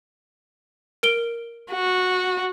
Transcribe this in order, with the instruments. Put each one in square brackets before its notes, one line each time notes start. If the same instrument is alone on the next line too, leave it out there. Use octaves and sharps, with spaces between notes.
[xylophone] A#4 D7 G7
[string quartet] F#4